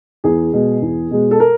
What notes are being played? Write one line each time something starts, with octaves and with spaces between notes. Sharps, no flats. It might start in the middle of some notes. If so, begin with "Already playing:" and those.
E2 G#4
B2 G#3
E2
B2 G#3
A4
A#4